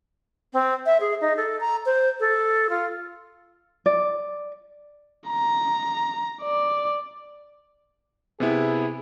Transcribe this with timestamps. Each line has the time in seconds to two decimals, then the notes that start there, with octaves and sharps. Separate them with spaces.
0.53 C4
0.86 E5
1.01 G#4
1.21 D#4
1.37 A4
1.60 A#5
1.86 C5
2.20 A4
2.70 F4
3.86 D5
5.30 A#5
6.41 D5
8.40 C3 B3 E4 G#4